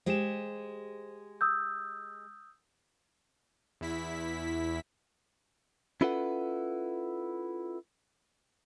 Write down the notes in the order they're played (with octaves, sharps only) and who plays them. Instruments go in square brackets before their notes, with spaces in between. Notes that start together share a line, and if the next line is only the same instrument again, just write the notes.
[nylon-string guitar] G#3 G4 G#4 [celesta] C5 E7
[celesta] D#6 E6 G6
[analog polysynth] E2 E4 B6
[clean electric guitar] C#4 E4 F4 A4 B4 F#5